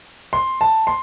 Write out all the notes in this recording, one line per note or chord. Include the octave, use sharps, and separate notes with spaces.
C6
A5
C6